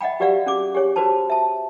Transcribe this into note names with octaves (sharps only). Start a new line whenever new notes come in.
D#5 E5 F#5 G5 B5
F#4 G4 B4 D5 F5 F#5
C#4 G#4 D6
G4 G#4 C#5
F#4 B4 C5 A5
E5 A5